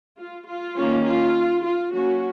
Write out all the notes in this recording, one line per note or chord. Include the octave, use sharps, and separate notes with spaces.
F4
F4
D#3 A#3 C#4
F4
F4
F#3 A#3 C#4 F#4